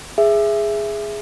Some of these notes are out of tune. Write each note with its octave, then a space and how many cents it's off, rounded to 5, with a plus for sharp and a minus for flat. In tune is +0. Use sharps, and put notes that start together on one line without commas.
G#4 +0 E5 +10